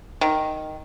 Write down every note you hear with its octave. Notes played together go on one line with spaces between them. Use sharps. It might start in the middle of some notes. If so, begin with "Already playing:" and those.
D#3